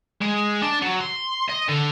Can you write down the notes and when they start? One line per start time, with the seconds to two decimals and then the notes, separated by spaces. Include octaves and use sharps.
0.22 G#3
0.62 D4
0.82 F#3
1.01 C6
1.49 D#5
1.68 D3